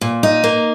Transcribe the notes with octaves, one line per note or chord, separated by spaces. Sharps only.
A#2
D#4
A#3